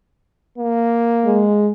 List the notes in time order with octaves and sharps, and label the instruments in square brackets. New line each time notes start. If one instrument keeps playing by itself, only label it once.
[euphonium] A#3
[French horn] G#3